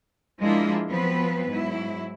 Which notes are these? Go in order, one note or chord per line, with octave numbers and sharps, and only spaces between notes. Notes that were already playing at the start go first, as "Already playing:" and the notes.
F3 G#3 A#3 D4 E4 F4
F3 F#3 B3 C4 B4
G#2 F#3 E4